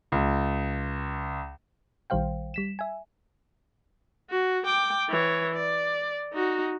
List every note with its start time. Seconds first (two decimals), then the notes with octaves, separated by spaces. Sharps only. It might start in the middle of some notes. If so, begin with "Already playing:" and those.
0.12 C#2
2.10 A#1 D#3 G3 C5 F5 G5
2.54 G3 B6 E7
2.79 E5 G#5
4.30 F#4
4.65 G5 D6
5.10 E3 C#5
5.55 D5
6.33 D#4 F#4